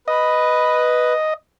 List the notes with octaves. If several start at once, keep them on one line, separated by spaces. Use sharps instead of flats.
B4 D#5